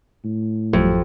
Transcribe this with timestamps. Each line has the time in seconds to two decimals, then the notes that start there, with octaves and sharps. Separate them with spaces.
0.25 A2
0.73 G#1 F2 F#3 G3